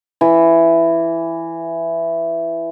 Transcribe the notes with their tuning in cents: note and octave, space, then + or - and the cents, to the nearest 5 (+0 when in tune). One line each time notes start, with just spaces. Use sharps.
E3 +10